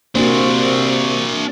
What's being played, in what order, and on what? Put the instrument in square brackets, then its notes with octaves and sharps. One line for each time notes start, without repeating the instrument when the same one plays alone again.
[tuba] C3 [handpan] A#3 F#4 [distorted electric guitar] D4 C5